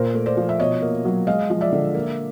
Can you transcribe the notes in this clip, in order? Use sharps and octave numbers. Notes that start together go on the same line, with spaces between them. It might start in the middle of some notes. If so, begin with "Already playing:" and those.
Already playing: A#2 A#4 C5
A3
C5 D5
F3
E5
B2 C#5 D#5
A#3
F#3
G#3 D#5 F5
F3
D5 E5
D3
A#3